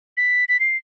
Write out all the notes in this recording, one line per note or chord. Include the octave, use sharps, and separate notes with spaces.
B6
B6
C7